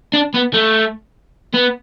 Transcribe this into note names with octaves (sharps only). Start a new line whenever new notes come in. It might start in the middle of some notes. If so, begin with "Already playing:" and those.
D4
B3
A3
B3